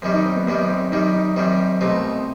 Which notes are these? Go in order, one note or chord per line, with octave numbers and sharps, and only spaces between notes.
F#2 D#3 G3 C4
D#4
C4
B3
F#2 D#3 G3 B3
C4
F#2 D#3 G3 D#4
D#4
F#2 D#3 G3 C4
C2 B2 A3 C4 D#4